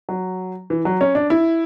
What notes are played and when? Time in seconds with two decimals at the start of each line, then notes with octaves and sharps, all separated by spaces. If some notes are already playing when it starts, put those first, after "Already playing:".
0.09 F#3
0.70 E3
0.85 F#3
1.01 C#4
1.15 D4
1.30 E4